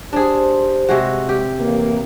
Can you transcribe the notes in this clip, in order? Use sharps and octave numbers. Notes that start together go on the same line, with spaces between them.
D4 G4 G#4 C5
C3 G#3 F#4
G4
A1 A#3